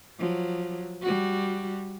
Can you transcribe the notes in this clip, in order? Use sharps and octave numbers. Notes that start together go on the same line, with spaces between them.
F3 F#3
G3 F#4